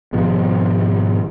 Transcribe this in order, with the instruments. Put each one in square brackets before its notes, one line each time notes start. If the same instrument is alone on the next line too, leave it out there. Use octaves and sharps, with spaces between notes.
[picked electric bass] G#1 G#2 B2 F3